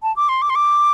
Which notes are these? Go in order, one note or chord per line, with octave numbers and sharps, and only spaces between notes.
A5
D6
C6
D6
C6
D6